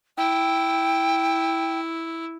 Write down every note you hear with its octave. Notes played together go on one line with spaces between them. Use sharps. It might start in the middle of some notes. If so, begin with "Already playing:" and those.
E4 G5